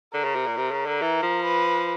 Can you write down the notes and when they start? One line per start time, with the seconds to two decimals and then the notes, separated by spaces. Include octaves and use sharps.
0.13 D3 A#4
0.24 C#3
0.35 C3
0.47 A#2
0.57 C3
0.71 C#3
0.86 D3
1.01 E3 A#4
1.22 F3
1.45 B4